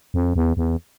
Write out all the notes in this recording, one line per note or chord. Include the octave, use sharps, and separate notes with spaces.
F2
E2
E2